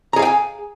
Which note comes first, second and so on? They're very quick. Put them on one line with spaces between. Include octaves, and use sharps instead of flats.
A#5 G#4 F5 G5 G#5